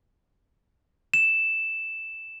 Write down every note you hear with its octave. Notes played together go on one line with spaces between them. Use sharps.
E7